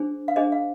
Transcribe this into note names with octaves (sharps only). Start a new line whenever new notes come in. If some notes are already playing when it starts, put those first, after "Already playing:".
Already playing: D4 G#4 C5
F5
D4 G#4 C5 D#5
F5